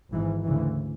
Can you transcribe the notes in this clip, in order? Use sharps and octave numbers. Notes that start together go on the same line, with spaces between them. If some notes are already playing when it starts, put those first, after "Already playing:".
G#1 G#2 E3
D2 C#3 E3